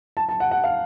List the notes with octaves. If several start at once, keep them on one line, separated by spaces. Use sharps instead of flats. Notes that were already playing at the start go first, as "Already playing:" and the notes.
A5
A5
F#5
F#5
F5